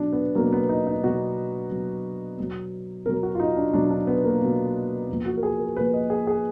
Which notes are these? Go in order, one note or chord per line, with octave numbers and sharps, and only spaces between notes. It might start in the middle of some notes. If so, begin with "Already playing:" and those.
Already playing: B2 F#3 D4
B3
B2 F#3 A#3
B3
D#4
D#4
B2 F#3 F#4
B2 F#3
B2 F#3
B2 F#3 A#4
F#4
F4
D#4
D4
B2 F#3 D4
D4
B3
A#3
B2 F#3
A#2 F3 B3
F#4
A#4
G#4
A#4
A#2 F3 B4
D#5
G#4
G#4